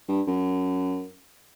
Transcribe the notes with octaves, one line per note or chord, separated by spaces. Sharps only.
G2
F#2